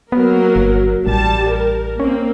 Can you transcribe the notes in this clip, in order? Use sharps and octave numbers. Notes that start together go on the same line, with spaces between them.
F#3 A#3 B3 A#4
G1
A1 G3 A5
A#4
A#3 C4 C#4